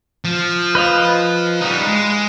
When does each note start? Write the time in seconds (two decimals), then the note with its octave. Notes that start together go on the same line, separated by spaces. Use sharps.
0.25 F3
0.75 B4 D#5 F5
1.61 G3 D#4
1.87 G#3